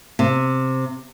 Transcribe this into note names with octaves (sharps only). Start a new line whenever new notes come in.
C3